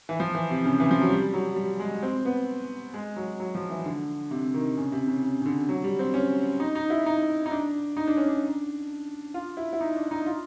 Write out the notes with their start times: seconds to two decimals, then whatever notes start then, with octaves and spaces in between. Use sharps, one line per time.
0.09 E3
0.20 F3
0.35 E3
0.50 C3
0.65 C#3
0.80 E3
0.91 F3
1.01 F#3
1.11 G3
1.34 F#3
1.56 G3
1.79 G#3
2.03 C4
2.25 B3
2.94 G#3
3.16 F#3
3.40 F#3
3.55 F3
3.70 E3
3.85 D3
4.31 C3
4.54 D#3
4.77 C#3
4.92 C3
5.07 C#3
5.23 C#3
5.41 C#3
5.46 D3
5.69 F#3
5.84 G3
5.99 C4
6.14 C#4
6.60 D#4
6.75 D#4
6.90 E4
7.06 D#4
7.46 D#4
7.51 D4
7.97 D#4
8.07 D4
8.17 C#4
8.27 D4
9.34 F4
9.57 E4
9.73 E4
9.81 D#4
9.96 D4
10.11 D#4
10.26 F4